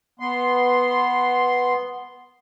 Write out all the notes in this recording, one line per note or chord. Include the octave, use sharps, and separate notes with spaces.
B3 C6